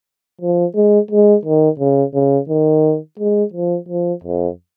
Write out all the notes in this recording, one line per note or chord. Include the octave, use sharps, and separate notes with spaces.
F3
G#3
G#3
D#3
C#3
C#3
D#3
G#3
F3
F3
F2